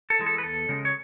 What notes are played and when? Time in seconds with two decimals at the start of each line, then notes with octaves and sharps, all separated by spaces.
0.10 A4
0.19 E3 G#3
0.26 A4
0.38 B4
0.43 E2 A4
0.69 C#3 G#3
0.85 C#5